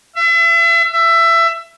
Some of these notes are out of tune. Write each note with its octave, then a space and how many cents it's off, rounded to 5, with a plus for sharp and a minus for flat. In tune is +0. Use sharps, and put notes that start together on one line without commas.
E5 +35
E5 +20